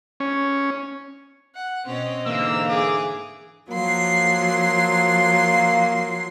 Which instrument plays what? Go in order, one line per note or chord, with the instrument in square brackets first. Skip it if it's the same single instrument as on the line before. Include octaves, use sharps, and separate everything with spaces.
[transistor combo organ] C#4
[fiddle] F#5
[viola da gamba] B2 C#4 C#5 [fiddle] C4 D#5
[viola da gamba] G#2 D3 E3 [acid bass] A#3 [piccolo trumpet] E6
[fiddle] G#4 [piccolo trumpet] D6
[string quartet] F3 F#3 C6 [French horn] A#3